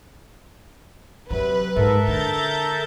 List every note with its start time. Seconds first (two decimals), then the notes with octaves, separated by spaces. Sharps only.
1.31 C3 F#3 B4
1.76 G#2 A4 A#4 E5
2.07 D3 A#5 G6 A6